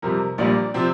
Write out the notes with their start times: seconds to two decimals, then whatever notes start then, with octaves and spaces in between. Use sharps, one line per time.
0.02 F2 C3 G3 A#4
0.38 A#1 A#2 G3 A#3 D5
0.74 C3 F3 C4